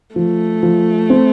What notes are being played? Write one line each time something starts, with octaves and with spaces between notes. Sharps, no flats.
F3 A3
F3
C4